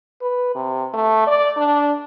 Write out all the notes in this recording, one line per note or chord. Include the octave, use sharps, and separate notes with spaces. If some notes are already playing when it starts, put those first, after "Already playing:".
B4
C3
A3
D5
D4